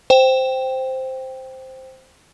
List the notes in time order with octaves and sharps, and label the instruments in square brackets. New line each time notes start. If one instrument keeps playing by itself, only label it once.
[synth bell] C5 G5